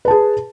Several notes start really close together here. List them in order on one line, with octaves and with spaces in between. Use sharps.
B4 A5 G#4